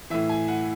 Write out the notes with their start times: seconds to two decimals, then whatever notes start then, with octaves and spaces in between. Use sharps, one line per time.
0.10 A2 E3 E5
0.29 G#5
0.48 F#5